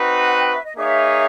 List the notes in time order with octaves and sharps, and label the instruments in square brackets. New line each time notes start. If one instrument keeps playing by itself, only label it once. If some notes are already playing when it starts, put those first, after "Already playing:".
Already playing: [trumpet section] C4 D#4 F#4 B4
[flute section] F#5
G5
F#5
G5
E5
D#5
[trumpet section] A#3 D#4 G#4 C#5 F5 [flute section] E5